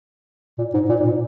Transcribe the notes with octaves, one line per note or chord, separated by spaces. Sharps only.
A#2
G#2
A#2
G#2
A#2